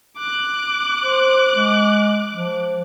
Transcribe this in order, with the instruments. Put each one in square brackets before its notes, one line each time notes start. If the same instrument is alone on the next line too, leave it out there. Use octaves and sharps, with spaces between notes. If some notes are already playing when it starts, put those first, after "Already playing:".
[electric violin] D6 F#6
[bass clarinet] C5
G#3
F3